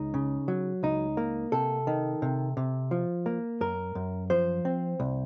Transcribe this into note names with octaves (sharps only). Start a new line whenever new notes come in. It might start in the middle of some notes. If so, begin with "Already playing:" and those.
Already playing: C#2 D#4
C#3
F#3
C#2 D#4
A#3
C3 A4
D#3
C3
C3
F3
A#3
F#2 A#4
F#2
F3 C5
C4
C2